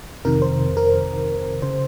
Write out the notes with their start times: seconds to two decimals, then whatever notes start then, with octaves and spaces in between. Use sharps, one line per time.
0.25 F2 C3 D#3 A#4
0.42 C5
0.77 A#4
1.62 C#3 C5